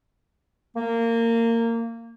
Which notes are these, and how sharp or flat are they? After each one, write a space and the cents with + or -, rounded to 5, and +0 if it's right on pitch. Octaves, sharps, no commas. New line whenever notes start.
A#3 -20